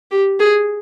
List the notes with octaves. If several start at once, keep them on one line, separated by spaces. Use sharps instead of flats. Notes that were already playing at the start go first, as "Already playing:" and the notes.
G4
G#4